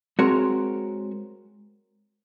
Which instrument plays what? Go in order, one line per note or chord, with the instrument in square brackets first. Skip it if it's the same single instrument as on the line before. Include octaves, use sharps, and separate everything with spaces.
[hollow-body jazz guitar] G#3 C4 F#4 A#4 C#5